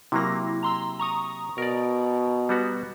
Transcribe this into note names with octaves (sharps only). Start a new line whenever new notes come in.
C3 F#3 A#3 E4 A#6
A#5 C6 E6
A#5 C#6 D#6
B2 A#4 D5
G3 B3 F#4